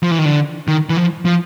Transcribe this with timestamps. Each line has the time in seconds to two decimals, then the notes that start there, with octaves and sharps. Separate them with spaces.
0.03 F3
0.11 E3
0.18 D#3
0.26 D3
0.68 D#3
0.90 E3
0.97 F3
1.25 F3